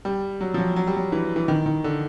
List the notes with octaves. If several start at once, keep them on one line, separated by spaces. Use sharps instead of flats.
G3
F#3
F3
F#3
F#3
G3
F#3
E3
E3
D#3
D#3
D3